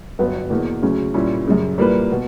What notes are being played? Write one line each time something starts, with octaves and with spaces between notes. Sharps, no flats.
G1 G2 F#3 B3
E2 B2 A#3
D2 C#3 F#3 C#4
A#2 G3 C#4 E4
F#2 C#3 G3
A#2 G3 A#3 E4 B4
B2